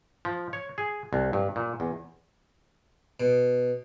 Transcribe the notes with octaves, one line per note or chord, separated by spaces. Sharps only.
F3
C#5
G#4
C2
G2
A#2
E2
B2